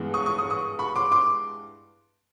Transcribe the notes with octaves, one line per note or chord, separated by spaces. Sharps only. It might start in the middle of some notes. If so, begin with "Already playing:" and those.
Already playing: G2 E3 G#3 B3
C#6 D#6
C#6 D#6
C#6 D#6
C#6 D#6
B5 C#6
C6 D6
C6 D6